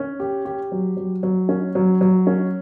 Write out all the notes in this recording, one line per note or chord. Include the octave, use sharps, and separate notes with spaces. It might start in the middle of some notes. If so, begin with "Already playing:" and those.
Already playing: C#4
G4
G4
F#3
F#3
F#3
C#4
F#3
F#3
C#4